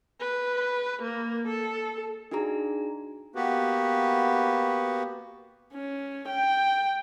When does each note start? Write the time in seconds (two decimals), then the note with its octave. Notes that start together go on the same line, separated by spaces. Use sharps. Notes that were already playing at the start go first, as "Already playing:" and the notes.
0.20 B4
1.02 A#3
1.48 A4
2.31 D4 D#4 F#4 G#4 A#5
3.35 A#3 B3 F#4 G4 B4
5.73 C#4
6.28 G5